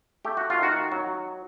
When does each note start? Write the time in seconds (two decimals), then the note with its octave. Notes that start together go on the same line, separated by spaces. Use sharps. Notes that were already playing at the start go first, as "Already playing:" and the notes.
0.25 A3 G4
0.37 F#4
0.50 F4
0.58 D#3 F#4
0.92 F#3